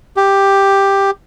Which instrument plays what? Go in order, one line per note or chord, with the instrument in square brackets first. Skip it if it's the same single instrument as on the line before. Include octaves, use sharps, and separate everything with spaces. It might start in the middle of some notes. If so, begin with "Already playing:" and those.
[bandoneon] G4